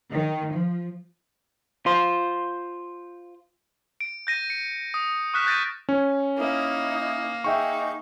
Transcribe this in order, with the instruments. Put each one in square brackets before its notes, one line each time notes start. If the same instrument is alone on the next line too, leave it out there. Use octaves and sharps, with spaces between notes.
[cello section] D#3
F3
[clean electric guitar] F4 C5
[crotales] D7
G6 A#6 D#7
C#7
D#6
C#6 D#6 F6 F#6 B6 E7
F#6 G6 A6 A#6 D7 D#7
[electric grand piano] C#4
[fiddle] A#3 [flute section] D#4 E4 D#6
[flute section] D#4 G#4 [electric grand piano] E5 G5 C#6